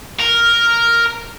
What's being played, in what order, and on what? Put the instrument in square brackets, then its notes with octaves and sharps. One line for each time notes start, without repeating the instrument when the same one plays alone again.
[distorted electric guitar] A#4